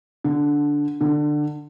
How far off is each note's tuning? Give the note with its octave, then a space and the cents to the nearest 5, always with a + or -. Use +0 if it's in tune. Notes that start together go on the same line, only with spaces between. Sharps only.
D3 -5
D3 +20